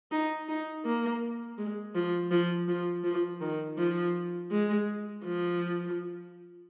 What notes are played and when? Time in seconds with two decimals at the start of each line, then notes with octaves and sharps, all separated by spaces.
0.12 D#4
0.48 D#4
0.86 A#3
1.58 G#3
1.95 F3
2.31 F3
2.68 F3
3.04 F3
3.41 D#3
3.78 F3
4.51 G#3
5.24 F3